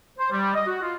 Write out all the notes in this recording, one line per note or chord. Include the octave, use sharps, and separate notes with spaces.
C5
G3
D#5
F#4
F4